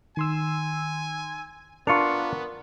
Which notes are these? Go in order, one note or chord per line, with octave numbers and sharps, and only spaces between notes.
D#3 G#5 C6 E6
B3 D4 F4 A#4 C#6 C#7 F7